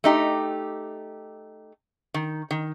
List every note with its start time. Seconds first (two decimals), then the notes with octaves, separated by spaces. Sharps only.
0.04 A3 D#4 G4
2.14 D#3
2.51 D#3